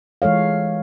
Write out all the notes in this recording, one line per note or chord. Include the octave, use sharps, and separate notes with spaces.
E3 G#3 A4 C#5 F5